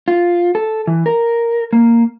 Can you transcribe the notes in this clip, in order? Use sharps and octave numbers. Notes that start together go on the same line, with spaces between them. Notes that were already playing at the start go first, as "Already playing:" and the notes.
F4
A4
E3
A#4
A#3